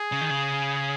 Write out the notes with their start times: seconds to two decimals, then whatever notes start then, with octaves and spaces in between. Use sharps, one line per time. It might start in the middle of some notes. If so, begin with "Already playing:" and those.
Already playing: G#4
0.12 C#3
0.21 D#3
0.30 C#3